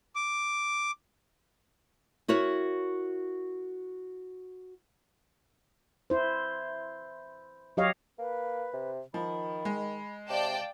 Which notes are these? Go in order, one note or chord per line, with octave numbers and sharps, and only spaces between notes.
D6
E4 F#4 A#4 C#5
E4 C5
F#3 G4 C#5 D#5 F5
A#3 B4
C3
D#3 F3 B5
G#3
C3 D5 F5 G5 A5